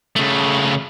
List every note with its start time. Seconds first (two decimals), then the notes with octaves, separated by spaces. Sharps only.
0.16 C#3 A3